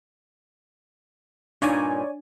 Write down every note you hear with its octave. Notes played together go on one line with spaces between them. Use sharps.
G2 A#2 D4 D#4 C#5 D5 G#5